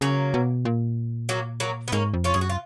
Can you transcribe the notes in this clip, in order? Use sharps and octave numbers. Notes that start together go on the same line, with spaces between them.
C#3 F#3 A#3
B2
A#2
F#3 A#3
F#3 A#3
B3
G#2 A#3 C#4
F2
C#4 F4
F#2 G#4
F#4
F4